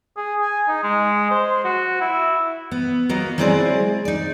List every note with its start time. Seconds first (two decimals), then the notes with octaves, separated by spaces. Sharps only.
0.17 G#4
0.42 G#5
0.68 D#4
0.83 G#3
1.31 C5
1.64 F#4
2.01 E4
2.71 B3
3.09 F#3 A#3 B3 D#5
3.38 F#3 G#3 C4 E4 G#4 D5
4.05 D#4 D5